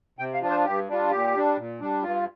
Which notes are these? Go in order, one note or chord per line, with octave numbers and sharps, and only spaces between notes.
C3 G5
F5
F3 D4 F4
C5
G2 G4
G3 D4 F4
A#2 G4
G3 D4
A#2
G3 D4
G2 F4